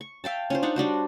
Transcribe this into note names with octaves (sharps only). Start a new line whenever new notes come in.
C#6
E5 F5 G5 A5
C#4 F4 C5
D4 D#4 F#5 C6
G3 D4 F#4 C5